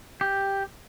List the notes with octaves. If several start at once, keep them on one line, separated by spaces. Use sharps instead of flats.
G4